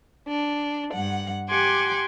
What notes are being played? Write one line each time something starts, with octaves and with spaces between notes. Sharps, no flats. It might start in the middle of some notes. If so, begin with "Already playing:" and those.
D4
G2 F#5
G4 F#5 G#5 C6 D6